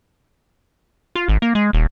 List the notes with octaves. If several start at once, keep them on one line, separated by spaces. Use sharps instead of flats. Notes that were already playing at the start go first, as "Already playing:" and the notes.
F4
G#1
A#3
G#3
D#1